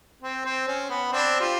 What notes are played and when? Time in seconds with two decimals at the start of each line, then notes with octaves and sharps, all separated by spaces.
0.22 C4
0.45 C4
0.67 C#4
0.90 B3
1.11 C4 D4
1.40 F4 G4